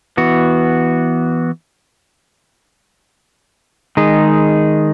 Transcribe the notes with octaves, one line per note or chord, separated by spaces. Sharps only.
E3 B3 F#4
D#3 G#3 D#4 G#4